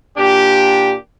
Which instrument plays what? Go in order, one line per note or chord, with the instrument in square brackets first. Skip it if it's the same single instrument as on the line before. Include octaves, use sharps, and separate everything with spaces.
[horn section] A#2 D4 G4